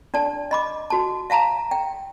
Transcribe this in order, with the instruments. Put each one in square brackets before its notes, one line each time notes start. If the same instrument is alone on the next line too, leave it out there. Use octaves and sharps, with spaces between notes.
[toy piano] D4 D5 A5
D#5 B5 D6
F#4 A5
E5 F5 A5 A#5
G5